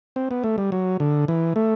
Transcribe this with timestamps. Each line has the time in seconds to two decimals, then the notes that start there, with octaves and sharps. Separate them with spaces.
0.16 C4
0.31 B3
0.44 A3
0.58 G3
0.72 F#3
1.00 D3
1.28 E3
1.56 A3